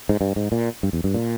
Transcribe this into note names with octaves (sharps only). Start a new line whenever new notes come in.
G#2
G2
G#2
A#2
G2
E2
G2
A#2